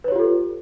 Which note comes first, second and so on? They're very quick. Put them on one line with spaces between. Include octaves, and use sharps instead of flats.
B4 C#5 G4 F4 A4